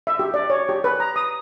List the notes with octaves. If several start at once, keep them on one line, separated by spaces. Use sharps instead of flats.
E5
G4
D5
C#5
G4
B4
A#5
D#6